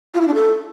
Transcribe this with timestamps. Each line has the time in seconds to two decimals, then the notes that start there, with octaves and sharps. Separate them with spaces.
0.14 F4
0.21 E4
0.27 D4
0.34 A4